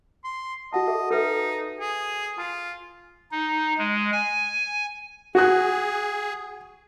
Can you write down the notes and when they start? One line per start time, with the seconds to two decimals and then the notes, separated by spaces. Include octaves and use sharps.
0.24 C6
0.73 F#4 D#5 F#5 A5
0.88 G#4 A4 E5
1.11 D#4 A4 B4 E5
1.80 G#4
2.38 F4 G#5
3.31 D#4
3.78 G#3
4.12 G#5
5.35 F#4 G#4 F#6